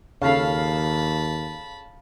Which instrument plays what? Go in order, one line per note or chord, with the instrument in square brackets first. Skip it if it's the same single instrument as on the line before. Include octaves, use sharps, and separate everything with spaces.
[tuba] D#2 [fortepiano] C#3 A4 [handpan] F5 [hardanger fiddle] A5 B5